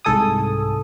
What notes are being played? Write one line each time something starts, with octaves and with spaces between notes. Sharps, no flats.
C2 G#2 A4 G#5 D#6